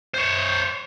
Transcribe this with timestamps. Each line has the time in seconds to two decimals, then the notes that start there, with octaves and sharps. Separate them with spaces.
0.14 C5 C#5